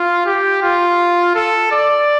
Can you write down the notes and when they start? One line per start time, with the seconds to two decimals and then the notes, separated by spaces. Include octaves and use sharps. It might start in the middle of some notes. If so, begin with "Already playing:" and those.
Already playing: F4
0.26 G4
0.62 F4
1.35 A4
1.72 D5